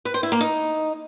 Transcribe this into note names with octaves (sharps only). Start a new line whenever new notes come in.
B4
C5
E4
A#3
D#4